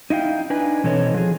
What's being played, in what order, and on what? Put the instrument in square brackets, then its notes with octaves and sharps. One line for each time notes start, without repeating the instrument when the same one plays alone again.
[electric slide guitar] D#4 E4 F5 G5
D4 D#4 B4 G#5
B2 E3 C4 A4 C#5 D#5
F3 G#4